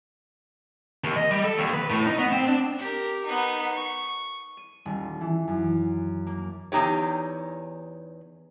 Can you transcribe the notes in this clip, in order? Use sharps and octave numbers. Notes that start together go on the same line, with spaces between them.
D#2
D#5
G3
A4
D#2
B4
A2
D#4
B3
C4
D4
G4 A#4
B3 D#4
C#6
D#7
D#1
E3
F#2
A#3
E2 F3 D#4 G4 C#5